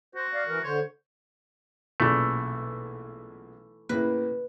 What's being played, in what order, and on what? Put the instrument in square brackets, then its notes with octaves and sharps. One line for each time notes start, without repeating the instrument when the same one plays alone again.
[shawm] F#4 [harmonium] C5
[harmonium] D5 F5
E3 A#4
[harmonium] D3 C5 [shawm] C#5
[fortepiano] B1 A#2 C#3 [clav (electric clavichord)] E3 A3
[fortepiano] A2 C#3 A#3 [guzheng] B4